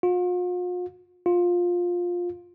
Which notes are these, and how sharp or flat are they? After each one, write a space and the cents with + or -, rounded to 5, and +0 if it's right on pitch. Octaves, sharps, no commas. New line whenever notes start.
F4 +45
F4 +15